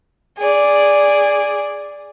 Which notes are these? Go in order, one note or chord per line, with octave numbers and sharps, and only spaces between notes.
G#4 D5